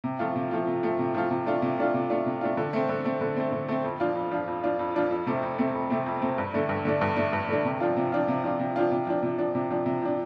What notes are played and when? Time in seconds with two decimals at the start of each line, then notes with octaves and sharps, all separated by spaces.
0.04 C3
0.19 F3 A3 F4
0.36 C3
0.51 F3 A3 F4
0.67 C3
0.83 F3 A3 F4
0.99 C3
1.14 F3 A3 F4
1.30 C3
1.46 A3 D4 F4
1.62 C3
1.78 A3 D4 F4
1.94 C3
2.10 A3 D4 F4
2.26 C3
2.41 A3 D4 F4
2.57 D3
2.73 A3 C4
2.89 D3
3.05 A3 C4
3.21 D3
3.37 A3 C4
3.52 D3
3.68 A3 C4
3.84 F2
4.00 F3 D4 F4
4.15 F2
4.31 F3 D4 F4
4.48 F2
4.63 F3 D4 F4
4.79 F2
4.95 F3 D4 F4
5.11 F2
5.27 C3 A3 C4
5.43 F2
5.58 C3 A3 C4
5.74 F2
5.90 C3 A3 C4
6.06 F2
6.22 C3 A3 C4
6.38 G2
6.54 D3 A3 D4
6.69 G2
6.85 D3 A3 D4
7.01 G2
7.16 D3 A3 D4
7.33 G2
7.49 D3 A3 D4
7.65 C3
7.80 F3 D4 F4
7.97 C3
8.12 F3 D4 F4
8.28 C3
8.44 F3 D4 F4
8.60 C3
8.76 F3 D4 F4
8.91 C3
9.07 F3 D4
9.23 C3
9.38 F3 D4
9.55 C3
9.70 F3 D4
9.86 C3
10.02 F3 D4